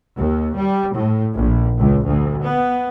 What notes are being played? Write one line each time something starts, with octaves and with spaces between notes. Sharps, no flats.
D#2
G3
A2
A#1
C#2
D2
B3